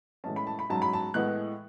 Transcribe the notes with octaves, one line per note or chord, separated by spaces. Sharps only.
A2 E3 G#3 C#4 A5
B5
A5
B5
G#2 F#3 C#4 A5
B5
A5
A2 E3 G#3 B3 F#6